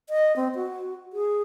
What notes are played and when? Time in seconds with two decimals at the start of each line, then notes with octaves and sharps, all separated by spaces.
0.10 D#5
0.36 C4
0.55 F#4
1.13 G#4